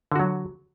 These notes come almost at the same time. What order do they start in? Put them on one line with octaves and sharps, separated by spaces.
D3 F#4 F#3